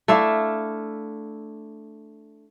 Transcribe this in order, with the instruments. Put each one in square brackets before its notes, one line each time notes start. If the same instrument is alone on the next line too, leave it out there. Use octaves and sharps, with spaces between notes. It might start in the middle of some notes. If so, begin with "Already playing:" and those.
[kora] A3 D4 E4 F5